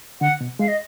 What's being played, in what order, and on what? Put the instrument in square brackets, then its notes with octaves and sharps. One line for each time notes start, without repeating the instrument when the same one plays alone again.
[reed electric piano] D3 [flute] F#5
[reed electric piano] B2
[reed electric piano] G#3 [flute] F5
[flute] D#5